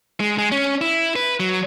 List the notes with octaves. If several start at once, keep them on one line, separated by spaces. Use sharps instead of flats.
G#3
G#3
C#4
E4
B4
F#3